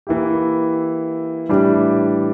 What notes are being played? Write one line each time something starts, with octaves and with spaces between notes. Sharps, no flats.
E3 A#3 E4 G4
A2 E3 G3 D4 G4